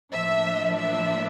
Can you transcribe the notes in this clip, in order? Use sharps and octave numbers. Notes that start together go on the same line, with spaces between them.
A2 F3 A#3 D4 E5
E5